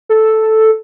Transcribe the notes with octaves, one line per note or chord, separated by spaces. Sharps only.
A4